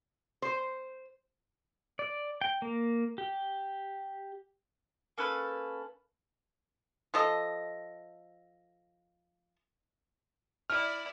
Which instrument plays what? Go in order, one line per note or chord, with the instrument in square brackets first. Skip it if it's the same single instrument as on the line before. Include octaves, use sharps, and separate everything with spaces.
[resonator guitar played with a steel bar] C5
[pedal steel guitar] D5
G5
A#3
G4
[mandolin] A#3 C#4 A4 B4
[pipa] F3 A4 D#5
[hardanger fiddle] E4 D5 [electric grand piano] F6